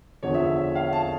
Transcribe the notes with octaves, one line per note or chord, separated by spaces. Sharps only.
E2 D3 F3 C#5
E5
E5
E5
F5
A5